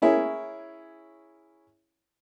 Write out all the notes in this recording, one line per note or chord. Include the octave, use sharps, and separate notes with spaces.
C#4 E4 G#4 A#4 C#5